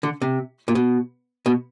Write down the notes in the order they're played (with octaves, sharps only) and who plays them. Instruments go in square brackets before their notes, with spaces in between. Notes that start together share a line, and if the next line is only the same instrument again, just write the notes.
[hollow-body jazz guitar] D3
C3
A#2
B2
B2